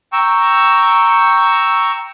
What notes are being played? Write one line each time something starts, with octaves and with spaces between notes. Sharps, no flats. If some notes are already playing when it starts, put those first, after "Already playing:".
G5 A#5 C#6 E6